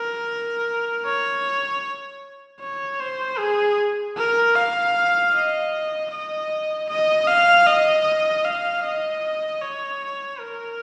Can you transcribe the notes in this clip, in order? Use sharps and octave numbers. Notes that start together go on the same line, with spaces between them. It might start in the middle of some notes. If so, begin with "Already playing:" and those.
Already playing: A#4
C#5
C#5
C5
G#4
A#4
F5
D#5
D#5
D#5
F5
D#5
F5
D#5
C#5
A#4